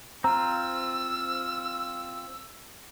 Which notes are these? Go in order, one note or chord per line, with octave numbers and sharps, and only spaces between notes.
C4 F4 A#5 E6